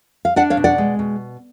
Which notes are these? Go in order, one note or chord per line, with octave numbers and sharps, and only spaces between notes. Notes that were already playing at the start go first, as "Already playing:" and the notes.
F5
D4 D5 F#5
C#5 F5
B2
D5 F#5
G#3
B2